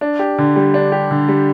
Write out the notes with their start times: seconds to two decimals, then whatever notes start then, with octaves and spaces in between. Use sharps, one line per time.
0.01 D4
0.19 G4
0.38 D3
0.56 G3
0.74 D4
0.92 G4
1.11 D3
1.28 G3